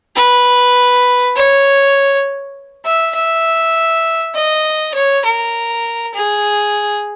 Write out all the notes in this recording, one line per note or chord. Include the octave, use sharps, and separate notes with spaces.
B4
C#5
E5
E5
D#5
C#5
A#4
G#4